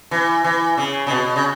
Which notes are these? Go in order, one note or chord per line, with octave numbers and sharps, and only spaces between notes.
E3
E3
C#3
C#3
B2
C#3